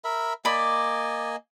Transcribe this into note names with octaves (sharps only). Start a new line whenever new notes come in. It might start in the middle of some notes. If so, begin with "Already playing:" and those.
A#4 E5 B5
A#3 D5 D#5 G#5 B5